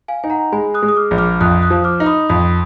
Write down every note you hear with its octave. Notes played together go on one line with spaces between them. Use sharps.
F5 G#5
D#4 G#5
F#5 A#5
G#3 G#5 B5
D#6 F#6
G#3
D#6
D6 F6
A#1
D6 F6
F2 D#6 F#6
D#6 F#6
F3
D6 F6
D#4
B5 D#6
F2 B5 D#6